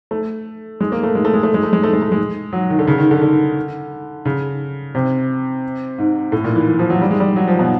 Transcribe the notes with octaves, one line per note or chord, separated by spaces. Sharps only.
A3
G#3
A#3
A3
G#3
A3
G#3
A3
G#3
A3
G#3
A3
G#3
A3
G#3
F#3
D#3
D3
C#3
D#3
D3
D3
C#3
C3
G#2
A2
A#2
E3
E3
F3
F#3
G3
G#3
G3
F#3
F3
B2